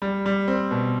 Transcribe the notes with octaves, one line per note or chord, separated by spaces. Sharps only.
G3
G3
C4
B2